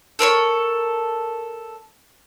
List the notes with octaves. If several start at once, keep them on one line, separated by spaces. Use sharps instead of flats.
A4 A#4 C5 C#5